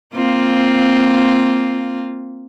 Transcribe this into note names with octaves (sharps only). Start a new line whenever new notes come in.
A#3 C4 F4